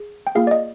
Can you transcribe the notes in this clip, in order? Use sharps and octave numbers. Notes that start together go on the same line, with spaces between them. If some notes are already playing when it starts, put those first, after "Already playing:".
Already playing: G#4
G5
A#3 F4 G#4 F5
D5
D#5